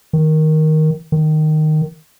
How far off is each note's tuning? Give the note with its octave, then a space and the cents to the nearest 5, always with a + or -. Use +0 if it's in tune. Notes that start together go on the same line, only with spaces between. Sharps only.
D#3 +5
D#3 -10